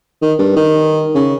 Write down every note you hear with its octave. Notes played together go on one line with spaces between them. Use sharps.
D#3
G2
D#3
C#3